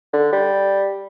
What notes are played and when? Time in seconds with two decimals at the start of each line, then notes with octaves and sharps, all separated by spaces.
0.13 D3
0.33 G3